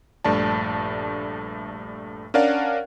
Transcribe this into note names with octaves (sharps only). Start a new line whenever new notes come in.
A#1 G2 A3 D5 A5
C#4 D4 A#4 D5 F5 F#5